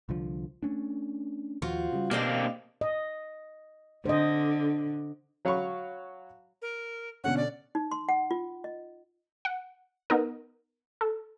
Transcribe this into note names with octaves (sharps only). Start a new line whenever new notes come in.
C2 D3 F3
A3 C#4 D4
D#2 F3 F4 F#4 C5
C#3 G3
B2 A#3 C4 D4 G4 D#5 F5
D#5
D3 C5 D#5
F#3 C#5 F5 B5 C#6
A#4
B2 D3 C#4 F#5
D5
D#4
C6
F#5
F4
D#5
F#5
B3 D#4 A#4
A4